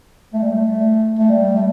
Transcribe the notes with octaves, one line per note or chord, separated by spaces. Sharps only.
A3
G3
A3
A3
G3
A3